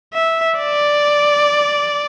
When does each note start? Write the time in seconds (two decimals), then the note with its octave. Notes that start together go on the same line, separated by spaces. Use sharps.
0.14 E5
0.58 D5